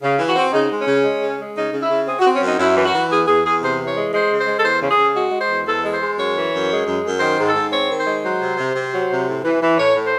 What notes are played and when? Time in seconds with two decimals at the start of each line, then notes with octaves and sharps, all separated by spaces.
0.01 C#3
0.19 E3
0.26 F#4
0.35 C4
0.52 C#3 D#4
0.69 G#3
0.78 C#4
0.87 C#3
1.04 G#3
1.20 C#3
1.38 G#3
1.55 C#3 D#4
1.72 C#3
1.81 E4
1.90 C#3
2.06 C4 G#4
2.19 F#4
2.24 C4
2.33 C#4
2.42 F#2 D#4
2.58 F#2 E4
2.75 E3
2.83 F#4
2.92 E3
3.09 E2 G#4
3.26 E2 G#4
3.44 E2 G#4
3.61 C3 C5
3.77 E3
3.87 C#5
3.95 G#3
4.12 G#3 C5
4.30 C#3
4.37 C5
4.47 G#3
4.57 A4
4.64 E2 C5
4.81 C#3
4.89 G#4
4.97 C#3
5.16 G#3 F#4
5.31 G#3
5.40 C5
5.50 E2
5.66 E2 A4
5.84 G#3
5.91 C5
6.01 G#3
6.17 F#2 C#5
6.35 E3
6.52 F#2
6.70 G#3
6.87 F#2
7.03 F#2
7.20 D#3 C5
7.38 G#2
7.47 A4
7.54 G#2
7.72 C4 C#5
7.90 D#3
7.98 C5
8.06 G#3
8.23 F#3 C5
8.41 C3
8.57 C3
8.75 C3
8.92 F#3
9.09 C3
9.26 A2
9.44 E3
9.61 E3
9.77 A2 C#5
9.94 A2
10.03 C5